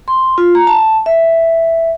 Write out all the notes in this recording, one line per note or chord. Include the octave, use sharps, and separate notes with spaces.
C6
F4
A#5
A5
E5